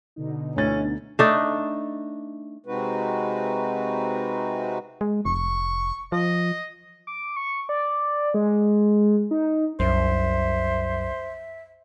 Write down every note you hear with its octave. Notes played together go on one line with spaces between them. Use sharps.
B2 D3 D#4
D2 E3 C#4 A6
A3 D4 D#4
C3 G#3 C4 D#4 F#4 B4
G#3
F1 C#6
F3 D#5
D6
C#6
D5
G#3
D#4
C2 F#2 C5 E5